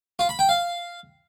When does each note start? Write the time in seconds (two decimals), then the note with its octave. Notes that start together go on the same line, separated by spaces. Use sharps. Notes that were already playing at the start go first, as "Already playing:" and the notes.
0.19 F4
0.29 B5
0.39 G5
0.49 F5